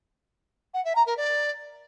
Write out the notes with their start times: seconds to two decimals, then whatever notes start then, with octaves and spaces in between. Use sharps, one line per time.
0.74 F#5
0.85 E5
0.95 A#5
1.06 A#4
1.17 D5